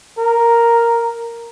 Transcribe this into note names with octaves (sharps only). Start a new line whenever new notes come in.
A#4